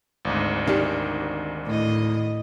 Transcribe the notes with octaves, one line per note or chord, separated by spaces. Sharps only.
G#1 D2 G#2
D#3 D4 G4
A2 D#5